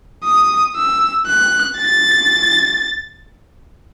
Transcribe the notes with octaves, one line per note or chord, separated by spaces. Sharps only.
D#6
E6
F#6
A6